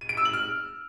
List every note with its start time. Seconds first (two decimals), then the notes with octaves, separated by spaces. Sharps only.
0.01 D#7
0.09 D7
0.17 E6
0.25 F#7
0.33 F6